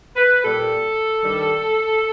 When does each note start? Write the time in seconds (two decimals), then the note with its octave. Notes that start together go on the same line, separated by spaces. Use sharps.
0.16 B4
0.43 A#2 G3 A4
1.22 G2 D#3 G3